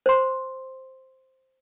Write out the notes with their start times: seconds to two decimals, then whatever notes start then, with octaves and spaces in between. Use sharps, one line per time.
0.06 C5 C6